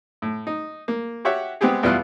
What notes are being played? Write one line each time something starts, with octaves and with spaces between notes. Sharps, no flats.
A2
D#4
A#3
F#4 G4 C#5 E5 F#5
G#3 B3 C4 G4 G#4
E2 B2 G3 E4 F4 F#6